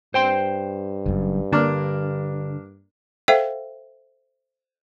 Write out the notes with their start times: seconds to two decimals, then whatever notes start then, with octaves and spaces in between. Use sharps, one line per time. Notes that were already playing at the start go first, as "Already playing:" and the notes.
0.14 G2 C5 G5 C6
1.06 F#1 F#2
1.52 D3 A#3 D4 A#4
3.28 A4 C5 E5 F5 G5